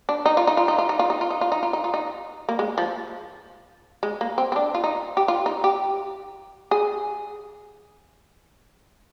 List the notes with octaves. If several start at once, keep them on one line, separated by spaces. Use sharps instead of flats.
D4
D#4
F4
D#4
F4
D#4
F4
D#4
F4
D#4
F4
D#4
F4
D#4
F4
D#4
F4
D#4
A#3
G#3
F3
G#3
A#3
C4
C4
D4
F4
D#4
G4
F4
D#4
G4
G#4